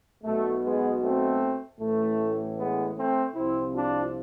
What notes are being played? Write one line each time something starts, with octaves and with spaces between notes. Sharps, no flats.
B1 B2 A3
G#3 B3
A3 C4
A1 A2 E3 A3
G#3 B3
A3 C4
C2 C3 F3 C4 E4
D4 F4